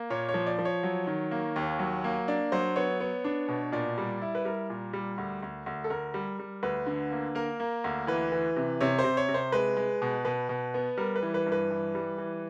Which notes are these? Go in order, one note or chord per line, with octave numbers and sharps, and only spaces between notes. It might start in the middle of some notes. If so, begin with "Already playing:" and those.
Already playing: A#3
A#2 C#5
C#5
F3
D5
F3
C#5
F#3
D#3
A#3
D#2
F#3
A#3
D4 D5
F#3 C5
B3 C#5
B3
D4
B2
A#2 D5
G3
E4
B4
G3 A#4
A#2
G3
D2
D2
D2
A4
D2 A#4
G3
G3
D2 B4
D3
A#3
A#3 A#4
A#3
D2
E3 B4
E3
C3
C3 C#5
C5
C3
C#5
C3
C5
G#3 B4
G#3
B2
B2 B4
B2
B3
G3 A#4
B4
E3
B4
G2
B4
E3
G3
E3